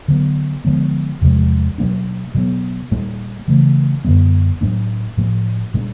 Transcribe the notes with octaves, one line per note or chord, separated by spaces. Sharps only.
D3 F#3 B3
D3 F3 G#3 B3
E2 C3 F3 G#3
B2 F#3 A#3 D4
B2 F#3 B3
A#2 G3 A#3
C#3 E3 A3
F#2 D3 G3 B3
A2 F#3 A#3 D4
A2 F3 A#3
A#2 G3 A#3 D4